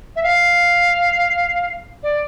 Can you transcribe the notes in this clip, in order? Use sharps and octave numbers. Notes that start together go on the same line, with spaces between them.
E5
F5
D5